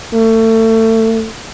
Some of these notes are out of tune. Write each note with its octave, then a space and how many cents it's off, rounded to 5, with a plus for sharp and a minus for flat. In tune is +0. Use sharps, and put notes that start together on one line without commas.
A3 +30